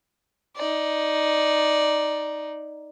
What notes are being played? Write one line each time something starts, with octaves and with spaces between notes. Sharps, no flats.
D#4 D5